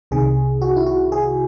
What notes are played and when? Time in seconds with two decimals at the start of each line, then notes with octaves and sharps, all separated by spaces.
0.11 C2 C3 D#3 G#4
0.62 F#4
0.76 E4
0.86 F#4
1.12 G#4